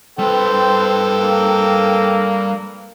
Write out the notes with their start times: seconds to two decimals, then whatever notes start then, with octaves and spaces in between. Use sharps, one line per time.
0.19 G3 C4 A4 B4 G5
1.21 A#3